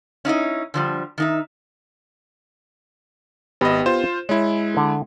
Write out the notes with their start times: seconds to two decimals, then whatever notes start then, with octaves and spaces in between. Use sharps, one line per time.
0.25 C#4 D#4 E4 D#5
0.74 D3 F3 G3
1.18 D#3 D#4 E5
3.61 G#1 B3 G4 D#5
3.86 F4 C5 E7
4.29 G#3 E4 C#5
4.77 D3